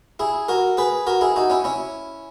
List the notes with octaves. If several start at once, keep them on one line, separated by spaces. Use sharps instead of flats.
E4 G#4
F#4 A#4
G#4 B4
F#4 A#4
E4 G#4
D#4 F#4
C#4 E4
C#4 E4